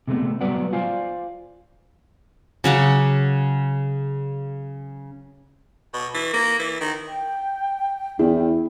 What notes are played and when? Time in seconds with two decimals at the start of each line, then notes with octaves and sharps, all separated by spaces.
0.08 C3 G#3 A3 B3
0.41 F#3 G3 B3 B4 D5 F#5
0.73 F4 C5 D5 F5 G#5
2.64 C#3 F#3 F#5 D6
5.94 B2
6.14 E3
6.33 A#3
6.59 E3
6.81 D#3
7.08 G5
8.19 E2 E4 G#4